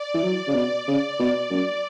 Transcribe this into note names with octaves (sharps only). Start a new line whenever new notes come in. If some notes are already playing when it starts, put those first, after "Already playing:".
Already playing: D5
E3
F#3
C#3
B2
C#3
B2
F#2